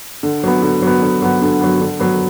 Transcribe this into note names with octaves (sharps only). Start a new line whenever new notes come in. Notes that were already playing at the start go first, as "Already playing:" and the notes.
D3
F#3 B3
D3
F#3 B3
D3
F#3 B3
D3
F#3 B3
D3
F#3 B3